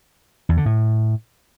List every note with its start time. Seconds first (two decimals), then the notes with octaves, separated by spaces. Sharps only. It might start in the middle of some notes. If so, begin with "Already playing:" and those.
0.49 E2
0.57 D3
0.66 A2